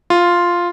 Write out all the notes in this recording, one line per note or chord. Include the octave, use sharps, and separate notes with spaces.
F4